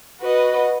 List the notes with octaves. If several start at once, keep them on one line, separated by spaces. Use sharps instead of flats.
F#4 B4 D#5